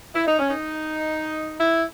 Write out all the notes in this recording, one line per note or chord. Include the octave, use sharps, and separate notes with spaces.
E4
D#4
C#4
D#4
E4